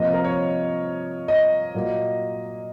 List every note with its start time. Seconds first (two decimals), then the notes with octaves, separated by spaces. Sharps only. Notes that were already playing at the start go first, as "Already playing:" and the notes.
Already playing: C3 F3 A#3 D#5
0.13 A#4
0.24 C#5
1.28 D#5
1.74 A#2 F#3 A#3